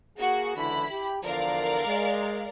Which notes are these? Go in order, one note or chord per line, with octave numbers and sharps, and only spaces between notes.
A#3 F#4 G#4
C#2 D3 E3 E4 B5
G4
E2 D3 F3 A#4 D5 F5
G#3